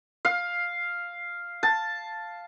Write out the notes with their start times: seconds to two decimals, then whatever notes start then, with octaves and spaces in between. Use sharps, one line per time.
0.25 F5
1.63 A5